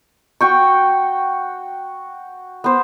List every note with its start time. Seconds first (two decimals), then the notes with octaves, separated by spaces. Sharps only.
0.41 F#4 G5 C#6
2.64 B3 C5